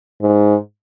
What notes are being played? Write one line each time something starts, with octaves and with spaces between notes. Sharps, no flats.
G#2